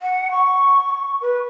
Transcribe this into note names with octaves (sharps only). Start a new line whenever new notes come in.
F#5
C#6
B4